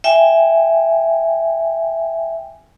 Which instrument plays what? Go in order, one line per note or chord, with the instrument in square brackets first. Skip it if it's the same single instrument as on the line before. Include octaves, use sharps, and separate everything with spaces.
[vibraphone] E5 G5 G#5